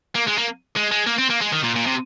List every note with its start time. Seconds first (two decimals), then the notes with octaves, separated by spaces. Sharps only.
0.15 A#3
0.27 G#3
0.38 A#3
0.76 G#3
0.91 G#3
1.06 A#3
1.18 C4
1.30 A#3
1.41 G#3
1.52 D#3
1.64 A#2
1.76 A#2
1.87 C3